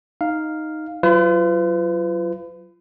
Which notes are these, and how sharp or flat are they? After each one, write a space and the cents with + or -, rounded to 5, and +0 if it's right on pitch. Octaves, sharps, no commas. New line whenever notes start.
D#4 +0 F5 +0
F#3 +0 F4 -30 B4 +40